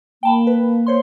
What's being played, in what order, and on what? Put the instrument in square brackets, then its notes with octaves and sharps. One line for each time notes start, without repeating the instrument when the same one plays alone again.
[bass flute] A#3 [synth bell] G5 A5 B5
[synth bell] B4
C5 C#5 C6